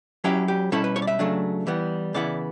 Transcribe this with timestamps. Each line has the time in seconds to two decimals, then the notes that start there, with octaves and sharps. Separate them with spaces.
0.24 F#3 C#4 E4 G4
0.48 G4
0.72 B2 G3 C#4 E4 A4
0.84 B4
0.96 C#5
1.02 D5
1.07 E5
1.19 C#3 F#3 A3 D4
1.67 E3 G3 B3
2.14 C#3 E3 B3 E4 D5